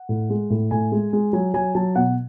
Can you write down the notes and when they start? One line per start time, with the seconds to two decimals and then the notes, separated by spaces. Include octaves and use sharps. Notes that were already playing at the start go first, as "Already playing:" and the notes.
Already playing: F#5
0.09 A2
0.30 G#3
0.50 A2
0.71 A2 G#5
0.92 G#3
1.13 G#3
1.33 F#3 G#5
1.54 F#3 G#5
1.75 F#3 A5
1.96 B2 F#5